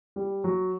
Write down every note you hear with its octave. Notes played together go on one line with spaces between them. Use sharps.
G3
F#3